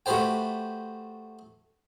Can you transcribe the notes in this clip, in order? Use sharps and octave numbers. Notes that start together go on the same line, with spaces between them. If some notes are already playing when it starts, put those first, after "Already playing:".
A3 F#4 G4 B4 C5 G5